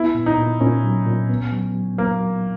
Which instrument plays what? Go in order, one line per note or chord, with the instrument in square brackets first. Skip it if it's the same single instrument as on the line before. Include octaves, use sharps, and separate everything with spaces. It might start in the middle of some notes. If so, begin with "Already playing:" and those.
Already playing: [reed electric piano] B3 [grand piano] E4
[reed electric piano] A#2
[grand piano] D#4
[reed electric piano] A#2
[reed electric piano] A#2 [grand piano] C#4
[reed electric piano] F#3
A#2
B3
F#3
F#3
[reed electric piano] F#3 [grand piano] A#3
[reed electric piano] F#3